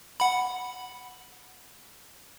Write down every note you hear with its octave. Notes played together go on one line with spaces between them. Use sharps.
F#5 B5